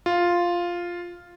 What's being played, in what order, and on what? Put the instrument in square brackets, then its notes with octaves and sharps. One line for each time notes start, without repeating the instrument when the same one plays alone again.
[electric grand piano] F4